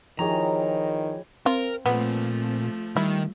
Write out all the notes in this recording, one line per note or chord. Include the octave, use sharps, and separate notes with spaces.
D#3 F3 E4 G4 G#4 C#5 D#5 A#5
C4 F4 A#4
A#2 F3 A3 B3
D#3 G3 E4